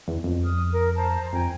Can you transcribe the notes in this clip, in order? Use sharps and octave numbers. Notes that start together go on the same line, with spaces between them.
E2
F2
D#6 F6
A#4
C5 A5 A#5
F2 G5 G#5 A#5